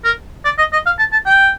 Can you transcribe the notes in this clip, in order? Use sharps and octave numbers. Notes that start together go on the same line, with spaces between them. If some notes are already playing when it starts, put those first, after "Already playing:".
A#4
D5
D#5
D#5
F5
A5
A5
G5